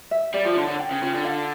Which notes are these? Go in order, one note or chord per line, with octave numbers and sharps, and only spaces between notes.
E5
G3 D5
F3
D3 C#4
D3
G5
C#3
C#3 F4
D3
F5